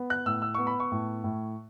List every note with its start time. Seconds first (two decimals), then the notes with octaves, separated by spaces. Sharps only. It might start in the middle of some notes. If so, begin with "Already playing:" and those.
Already playing: B3
0.10 F#6
0.26 A2 E6
0.42 E6
0.54 B3 C#6
0.67 B5
0.80 C#6
0.92 A2
1.24 A2